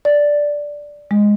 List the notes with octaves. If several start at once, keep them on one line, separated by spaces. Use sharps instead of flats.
D5
G#3